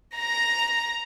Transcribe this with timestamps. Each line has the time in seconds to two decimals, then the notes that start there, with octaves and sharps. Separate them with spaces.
0.17 A#5 A#6